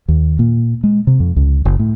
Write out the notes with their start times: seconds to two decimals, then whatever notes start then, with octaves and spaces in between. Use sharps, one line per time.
0.08 D#2
0.39 A#2
0.84 G#3
1.07 C3
1.20 F2
1.36 C#2
1.65 F#1
1.79 A2